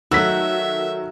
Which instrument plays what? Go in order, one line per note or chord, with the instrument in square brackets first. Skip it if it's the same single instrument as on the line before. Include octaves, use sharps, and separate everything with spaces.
[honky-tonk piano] D#3 F#3 A3 [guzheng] F#4 [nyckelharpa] E5 [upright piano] E6 B6